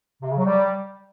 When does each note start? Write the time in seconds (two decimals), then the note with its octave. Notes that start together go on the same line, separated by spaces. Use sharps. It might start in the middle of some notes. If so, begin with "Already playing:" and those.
0.22 C3
0.29 C#3
0.37 F#3
0.44 G3